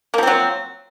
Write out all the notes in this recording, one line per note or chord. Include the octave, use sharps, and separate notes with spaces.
F3 F#3 A#3 C4